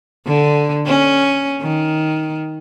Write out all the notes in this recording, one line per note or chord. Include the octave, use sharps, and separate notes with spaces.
D3
C#4
D#3